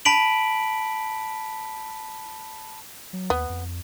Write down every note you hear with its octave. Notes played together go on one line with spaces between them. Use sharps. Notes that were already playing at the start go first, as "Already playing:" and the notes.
A5 B5 B6 D7 F#7
F#3
D#2 B3
F2